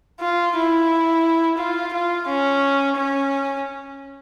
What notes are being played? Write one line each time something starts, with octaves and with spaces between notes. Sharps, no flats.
F4
E4
F4
F4
C#4
C#4